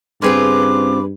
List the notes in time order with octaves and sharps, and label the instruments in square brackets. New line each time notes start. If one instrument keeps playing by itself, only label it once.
[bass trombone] G2 [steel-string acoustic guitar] C#3 C4 F4 [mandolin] G#4 B4 C6 [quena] D6